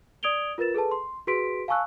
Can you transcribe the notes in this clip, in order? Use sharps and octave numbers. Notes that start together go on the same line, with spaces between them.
D5 D#6 G#6 D7 F7 G7
F4 A#4 B4 A6 E7
G#4 A4 B4 A5
C6
F#4 G#4 B4 C6 B6 D7
F5 G#5 A5 C#6 E6 F#6